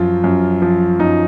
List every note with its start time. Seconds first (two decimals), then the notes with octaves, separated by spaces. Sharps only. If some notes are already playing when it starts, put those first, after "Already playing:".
Already playing: F#2 F3 F4
0.24 F#2
0.62 F3
1.00 F#2 D#4